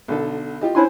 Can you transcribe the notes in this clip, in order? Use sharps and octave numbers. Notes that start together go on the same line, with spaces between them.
B1 D3 A4
F4 G4 D#5
C#4 D4 E4 C5 G#5 C6